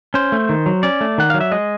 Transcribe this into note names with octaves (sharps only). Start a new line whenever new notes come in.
C#4 C5
A3
D#3
F#3
C#4 D5
A3
D#3 F#5
F#3 F5
E5
G#3 D#5